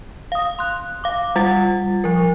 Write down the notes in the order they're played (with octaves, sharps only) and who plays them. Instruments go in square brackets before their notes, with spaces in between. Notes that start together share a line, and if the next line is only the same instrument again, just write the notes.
[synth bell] F5 D#6
C6 F#6
F5 D6
G3 F4 F#5 A6
F3 A#4